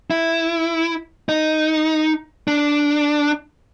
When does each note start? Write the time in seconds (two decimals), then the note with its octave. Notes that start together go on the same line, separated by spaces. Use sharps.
0.11 E4
1.29 D#4
2.48 D4